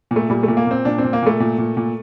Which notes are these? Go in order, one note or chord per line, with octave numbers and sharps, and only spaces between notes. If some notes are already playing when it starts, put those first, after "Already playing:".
A#2
A3
A#2 G3
A3
A#2
A#3
A#2 C4
A#2 D4
C4
A#2
A#3
A#2 A3
A#2
A#2
A#2